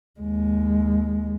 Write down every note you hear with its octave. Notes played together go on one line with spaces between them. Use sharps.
D#2 G#3